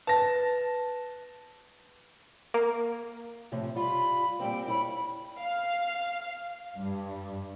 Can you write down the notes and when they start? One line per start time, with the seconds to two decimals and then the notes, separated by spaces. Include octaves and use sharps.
0.07 B4 A5 A6 A#6
2.54 A#3
3.52 A2 C3 F3
3.76 G3 F4 B5
4.40 A#2 G3 C4 G5
4.68 E4 C#5 B5
5.39 F5
6.77 G2